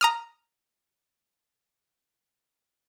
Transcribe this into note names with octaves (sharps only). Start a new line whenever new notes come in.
A#5 D#6 F6